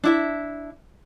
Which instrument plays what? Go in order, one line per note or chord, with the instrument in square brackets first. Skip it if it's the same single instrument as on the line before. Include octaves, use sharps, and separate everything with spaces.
[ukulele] D4 E4 E5